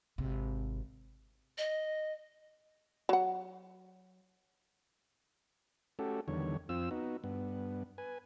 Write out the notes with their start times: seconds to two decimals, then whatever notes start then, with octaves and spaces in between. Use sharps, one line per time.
0.18 G#1 C3
1.58 D#5
3.09 F#3 F#5
5.99 A3 C#4 F#4 G4 A4
6.28 E2 D3 D#3 G3 C#5
6.69 F2 C4 F4 E6
6.91 B3 D#4 F#4
7.24 G2 B3
7.98 B4 G#5